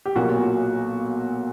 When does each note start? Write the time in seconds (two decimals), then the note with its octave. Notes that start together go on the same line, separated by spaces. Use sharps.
0.05 G4
0.15 B1 A#2 F#3 A#3 F#4